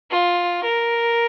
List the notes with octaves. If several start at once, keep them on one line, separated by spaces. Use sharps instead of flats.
F4
A#4